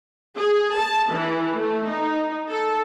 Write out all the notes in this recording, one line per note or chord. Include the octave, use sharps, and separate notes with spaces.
G#4
A5
E3
A3
D#4
A4